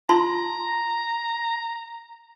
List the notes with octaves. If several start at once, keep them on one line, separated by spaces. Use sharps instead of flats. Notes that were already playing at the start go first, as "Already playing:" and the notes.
F4 A5 A#5 C6